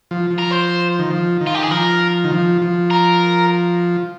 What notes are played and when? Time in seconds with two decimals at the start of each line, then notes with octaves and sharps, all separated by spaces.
0.11 F3
0.31 F3
0.38 A#4
0.51 C5
0.99 D#3
1.10 F3
1.41 D#3
1.47 F4
1.55 G4
1.62 G#4
1.71 F3 A#4
2.25 D#3
2.31 F3
2.62 F3
2.91 A#4